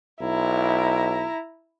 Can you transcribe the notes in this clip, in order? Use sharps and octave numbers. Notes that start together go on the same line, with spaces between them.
B1 E4 A#5